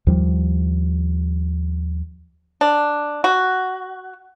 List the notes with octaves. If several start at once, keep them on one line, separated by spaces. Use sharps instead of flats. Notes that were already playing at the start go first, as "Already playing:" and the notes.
D#2 F3 G3
D4
F#4